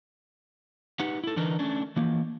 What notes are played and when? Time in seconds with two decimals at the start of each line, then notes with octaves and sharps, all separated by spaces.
1.00 D#4 G4 B4 F#5
1.24 E4 A4
1.36 D3 E3 D4 D#4 A#4 B4
1.59 A3 C#4 D4
1.96 E3 F3 A#3